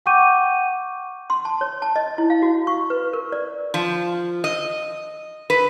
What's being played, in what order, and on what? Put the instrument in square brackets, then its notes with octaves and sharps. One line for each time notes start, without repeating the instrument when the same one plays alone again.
[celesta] F#5 G5 C#6 D6 G6 D#7
[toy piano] C6
A5
C#5
A5
D#5
E4
F5
F#4
C#6
B4
A#4
D5
[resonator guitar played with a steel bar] F3
D#5
B4